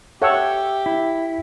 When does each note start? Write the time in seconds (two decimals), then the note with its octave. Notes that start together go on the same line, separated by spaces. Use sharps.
0.22 G4 A4 C#5 E5 F#5 G5 E6
0.86 E4